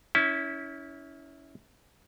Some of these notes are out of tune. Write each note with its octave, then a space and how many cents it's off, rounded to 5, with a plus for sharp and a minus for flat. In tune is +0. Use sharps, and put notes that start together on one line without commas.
C#4 +20 E4 -20